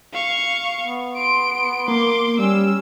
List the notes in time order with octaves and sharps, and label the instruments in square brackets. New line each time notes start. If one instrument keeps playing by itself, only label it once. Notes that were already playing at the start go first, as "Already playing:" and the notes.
[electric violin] F5 C#6
[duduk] B3
[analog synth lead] C6 [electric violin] D7
[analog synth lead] A#3 [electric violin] C6 D6
[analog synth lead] G3 [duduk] C#4 [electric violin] E6